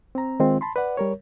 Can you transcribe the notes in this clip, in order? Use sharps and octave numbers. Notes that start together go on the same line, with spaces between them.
C4 A#5
D#3 G#3 C4 D#4 F4
A5 B5 C6
B4 D5 F#5
G3 A#4 C#5